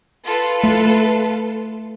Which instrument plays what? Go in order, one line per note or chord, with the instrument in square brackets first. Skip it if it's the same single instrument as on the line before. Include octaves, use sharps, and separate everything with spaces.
[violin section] F4 A4 B4
[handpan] A3